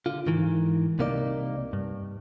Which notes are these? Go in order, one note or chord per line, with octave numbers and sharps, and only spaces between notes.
D3 F4
G#2 D#3 E3
C2 C3 A#3 D#4 D5
G2